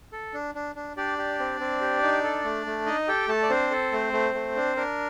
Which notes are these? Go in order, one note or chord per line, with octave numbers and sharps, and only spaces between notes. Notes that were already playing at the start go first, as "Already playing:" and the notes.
A4
D4
D4
D4
D4 G4 D5
G4
C4
C4
G4
D#4
A4
A3
A3
D#4 D#5
G4 A4 G5
A3 A4 A5
D5
C4 D4 C5
A4
A3
A3
A3
D4
D4 A#4